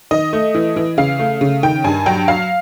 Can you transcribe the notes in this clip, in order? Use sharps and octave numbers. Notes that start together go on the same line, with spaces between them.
D#3 D#5
A3
E3
E3
C#3 F5
A3
C#3
D#3 G5
G2 G#5
F#3 G5
F#3 F5